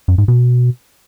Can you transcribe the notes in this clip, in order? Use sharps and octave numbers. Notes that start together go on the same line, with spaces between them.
F#2
G#2
B2